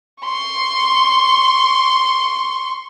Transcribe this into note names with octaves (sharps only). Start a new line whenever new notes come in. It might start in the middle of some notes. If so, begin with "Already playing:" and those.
C6 C#6